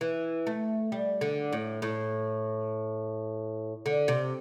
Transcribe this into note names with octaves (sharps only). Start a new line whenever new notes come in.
E3
A3
G3
D3
A2
A2
D3
C3